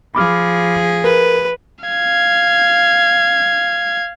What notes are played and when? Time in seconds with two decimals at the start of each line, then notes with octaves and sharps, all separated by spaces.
0.15 F3 G#4 B5 D6 F6
1.04 A#4 B4
1.85 F5 G#6